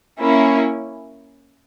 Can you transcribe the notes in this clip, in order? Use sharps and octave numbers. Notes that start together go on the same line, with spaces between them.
A#3 C#4 E4